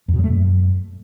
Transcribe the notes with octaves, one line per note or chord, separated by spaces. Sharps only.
F2
B2
F#3
A3
F#2